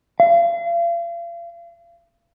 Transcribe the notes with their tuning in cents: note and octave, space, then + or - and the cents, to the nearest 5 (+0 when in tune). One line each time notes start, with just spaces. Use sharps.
F5 -40